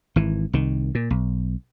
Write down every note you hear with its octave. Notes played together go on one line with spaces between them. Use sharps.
G#1 E3
C2 D#3
A#2
B1